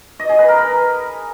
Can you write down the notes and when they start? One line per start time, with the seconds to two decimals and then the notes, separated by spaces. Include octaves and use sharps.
0.20 D#5
0.29 G#4
0.39 B4
0.48 A#4
0.58 B5